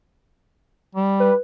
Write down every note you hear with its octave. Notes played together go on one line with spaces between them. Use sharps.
G3
B4